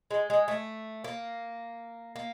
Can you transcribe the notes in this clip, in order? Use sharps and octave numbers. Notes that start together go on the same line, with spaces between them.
G#3
G#3
A3
A#3
A#3